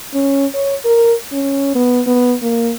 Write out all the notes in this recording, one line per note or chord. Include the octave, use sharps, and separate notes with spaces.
C#4
C#5
A#4
C#4
B3
B3
A#3